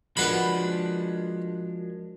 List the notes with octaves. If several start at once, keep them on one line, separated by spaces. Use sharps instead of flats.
F3 G#3 D4 F#4 A#4 B4 F#5 B5